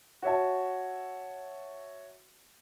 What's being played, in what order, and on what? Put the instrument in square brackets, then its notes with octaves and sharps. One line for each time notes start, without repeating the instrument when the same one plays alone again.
[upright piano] F#4 C#5 E5 A5